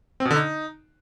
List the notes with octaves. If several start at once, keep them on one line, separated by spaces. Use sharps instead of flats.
C4
B2
D3
D#4